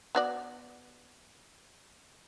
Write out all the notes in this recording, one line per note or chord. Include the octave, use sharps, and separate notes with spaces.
B3 F#4 D5